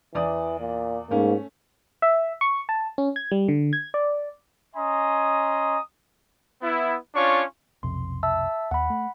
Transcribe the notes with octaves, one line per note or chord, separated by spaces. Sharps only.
E2 E3 D5 D#6
A#2
G#2 A3 A#3 C#4
E5
C#6
A5
C#4
G#6
G3
D3
G#6
D5
C#4 D#5 G#5 A#5 C6 D#6
B3 E4
C#4 D4 F4 C#5 C#6
B1 F2 C3 C6
E5 A5 E6
D#2 F#5 B5
A3